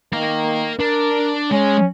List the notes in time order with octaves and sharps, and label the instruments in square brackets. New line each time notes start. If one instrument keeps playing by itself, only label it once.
[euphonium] D#3 [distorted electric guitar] A#4 F5
[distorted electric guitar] D4 [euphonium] A#4
[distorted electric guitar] G#3 [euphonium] C#4